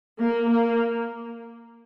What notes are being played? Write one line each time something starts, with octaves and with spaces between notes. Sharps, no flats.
A#3
A#3